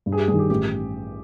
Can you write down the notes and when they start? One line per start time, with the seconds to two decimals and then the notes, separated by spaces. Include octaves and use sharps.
0.06 G2
0.12 G#4
0.17 G4
0.28 D#3 G3 G#4
0.39 G4
0.49 A1 G4